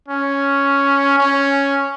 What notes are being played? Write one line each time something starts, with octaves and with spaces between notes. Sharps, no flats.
C#4
C#4